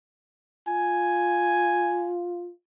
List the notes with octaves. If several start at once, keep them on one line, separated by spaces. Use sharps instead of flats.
F4 G#5